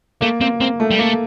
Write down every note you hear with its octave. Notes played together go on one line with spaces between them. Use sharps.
A3 A#3
A#3 C4
A#3 C4
A3
G3
A3 A#3